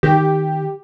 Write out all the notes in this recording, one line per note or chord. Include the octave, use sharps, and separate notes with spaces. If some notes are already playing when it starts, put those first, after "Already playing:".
D#3 G4